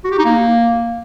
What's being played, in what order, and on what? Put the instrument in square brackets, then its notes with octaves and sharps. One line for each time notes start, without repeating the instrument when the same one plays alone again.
[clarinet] F#4
G4
D#4
A#3